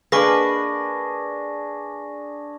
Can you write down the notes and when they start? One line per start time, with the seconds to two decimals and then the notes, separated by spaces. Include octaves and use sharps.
0.12 A#3 D4 G#4 B4 C#6 A#6